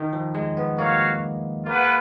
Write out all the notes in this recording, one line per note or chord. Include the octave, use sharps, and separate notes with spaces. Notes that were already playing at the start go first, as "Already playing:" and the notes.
Already playing: D#3
F3
G#3
B3
A#3 F#4 C#5 F5
A#3 F4 G#4 B4 F#5